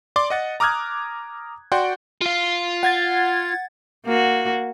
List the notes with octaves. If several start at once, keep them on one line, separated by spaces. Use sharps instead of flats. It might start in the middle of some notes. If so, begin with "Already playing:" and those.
D5 C6 D6
D#5 F#5 A6
A#5 D6 D#6 F6 F#6 G#6
F#4 D5 F#5 G5 C6
F4 F5
F#5 G#6 A6
A#3 F#4